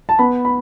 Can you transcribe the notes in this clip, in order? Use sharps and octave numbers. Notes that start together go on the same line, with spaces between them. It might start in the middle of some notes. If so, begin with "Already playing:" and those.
A5
B3 B5
B5